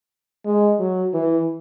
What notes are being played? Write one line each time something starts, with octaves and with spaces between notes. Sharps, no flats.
G#3
F#3
E3